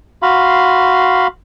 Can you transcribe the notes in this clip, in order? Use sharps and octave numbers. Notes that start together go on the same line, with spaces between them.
F#4 F5 B5 C6